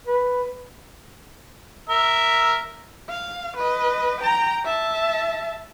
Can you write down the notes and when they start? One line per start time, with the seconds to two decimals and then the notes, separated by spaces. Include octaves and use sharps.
0.07 B4
1.89 A#4 E5
3.09 F5
3.57 B4 D#5
4.21 G5 A#5
4.65 E5 A5